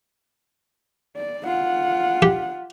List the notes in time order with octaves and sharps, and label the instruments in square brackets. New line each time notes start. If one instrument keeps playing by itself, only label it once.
[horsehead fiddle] D5
F4 F#5
[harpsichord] G4